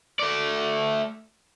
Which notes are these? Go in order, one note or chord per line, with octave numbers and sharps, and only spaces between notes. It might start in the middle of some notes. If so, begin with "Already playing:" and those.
A3 D5